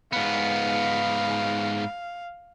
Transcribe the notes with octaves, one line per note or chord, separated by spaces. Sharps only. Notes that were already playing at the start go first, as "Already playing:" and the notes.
G#2 B3 F5